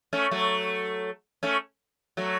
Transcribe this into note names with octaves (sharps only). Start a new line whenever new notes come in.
A3 C#4
F#3 A3
A3 C#4
F#3 A3